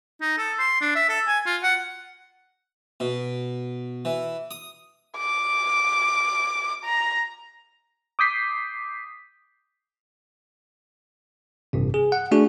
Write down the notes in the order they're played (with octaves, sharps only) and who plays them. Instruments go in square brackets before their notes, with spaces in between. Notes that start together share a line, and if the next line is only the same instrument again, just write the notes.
[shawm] D#4
A4
C6
D4
E5
A4
G#5
F4
F#5
[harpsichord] B2
E3
D#6
[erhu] D6
A#5
[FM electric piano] D6 D#6 G6 B6 C7
[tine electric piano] A1 G2 C3
G#4
F#5
A3 D4 F#4 G#4